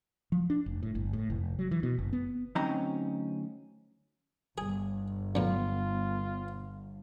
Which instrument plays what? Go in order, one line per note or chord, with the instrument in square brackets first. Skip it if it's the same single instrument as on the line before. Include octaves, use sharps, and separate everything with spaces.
[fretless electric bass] F3
D4
F1
A2
G1
A2
F1
F#3
E3
B2
F#1
B3
[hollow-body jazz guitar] D2 F#3 C4 C#4 D#4 A#5
[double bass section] G1 [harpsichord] G#4
[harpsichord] F#2 A2 [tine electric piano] B3 [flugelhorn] F4